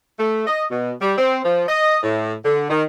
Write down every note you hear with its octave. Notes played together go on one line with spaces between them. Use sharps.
A3
D#5
B2
G3
C4
F3
D#5
A2
D3
D#3